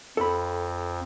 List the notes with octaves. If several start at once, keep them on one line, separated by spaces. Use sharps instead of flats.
F2 A4 B5